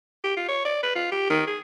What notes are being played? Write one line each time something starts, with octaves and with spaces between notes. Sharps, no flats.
G4
F4
C#5
D5
B4
F4
G4
D#3
G#4